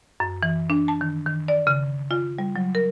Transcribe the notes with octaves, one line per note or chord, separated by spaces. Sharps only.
F#2
E3
D4
A5
D#3
D#3
D5
C#3
F4
G3
F#3
A#4